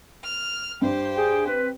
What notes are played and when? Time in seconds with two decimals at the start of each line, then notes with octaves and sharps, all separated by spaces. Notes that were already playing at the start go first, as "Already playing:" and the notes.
0.24 F6
0.82 G2 G4 C5
1.16 G#4 G5
1.47 C4 B4